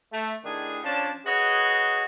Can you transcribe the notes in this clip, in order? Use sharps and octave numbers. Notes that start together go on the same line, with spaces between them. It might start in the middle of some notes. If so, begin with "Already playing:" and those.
A3
A2 D#3 D4 G#4
F3 C#4 D4 D5 A5
F#4 G#4 B4 C#5 D#5